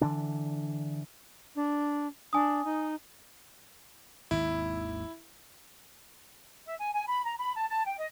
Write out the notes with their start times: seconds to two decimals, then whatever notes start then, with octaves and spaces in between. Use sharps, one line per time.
0.01 D3 E3 D4
1.55 D4
2.33 D4 G#5 D#6
2.64 D#4
4.31 G#1 D#2 E4
6.66 E5
6.78 G#5
6.94 G#5
7.08 B5
7.25 A#5
7.38 B5
7.56 A5
7.69 A5
7.86 G5
7.98 D#5